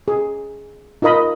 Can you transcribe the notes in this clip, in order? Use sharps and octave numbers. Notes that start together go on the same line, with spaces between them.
G#4
D#4 F4 A#4 D#5 B5